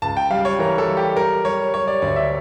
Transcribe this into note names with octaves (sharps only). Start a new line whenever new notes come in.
C#2 A5
G5
G3 F5
C#5
E3 A#4
A4
G3
G4
G3 A#4
G3 C#5
G3 C#5
D5
D2 D5
E5